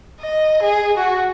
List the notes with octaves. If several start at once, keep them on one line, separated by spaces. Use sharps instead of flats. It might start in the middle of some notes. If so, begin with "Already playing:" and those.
D#5
G#4
F#4